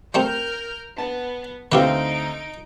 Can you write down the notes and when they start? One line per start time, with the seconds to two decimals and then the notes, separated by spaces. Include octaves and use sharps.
0.14 G3 A3 C4 A#4 F6 G6
0.98 B3 A5
1.72 D2 C4 D#4 E4 G4 B4 F5 D7